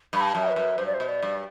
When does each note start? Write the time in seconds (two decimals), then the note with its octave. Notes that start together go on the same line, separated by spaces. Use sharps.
0.13 G2 B5
0.21 A5
0.35 F#2
0.49 B4
0.56 F#2
0.78 G2 C5
0.86 D5
0.94 C5
1.00 B2
1.08 D5
1.23 G2